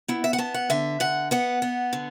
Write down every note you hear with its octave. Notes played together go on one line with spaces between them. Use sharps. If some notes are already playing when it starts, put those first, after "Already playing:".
B3 E4
E5
F#5
B3 A5
F#5
D3 E5
D3 F#5
B3 F#5
B3
D3